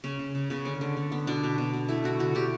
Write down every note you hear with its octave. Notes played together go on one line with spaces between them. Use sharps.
C#3 C#4
C#3
C#3
C#3 B3
D3 C#4
D3
D3
B3
B2 D4
B2
B2
B2
A3 E4
D3 F#4
D3 F#4
D3 G4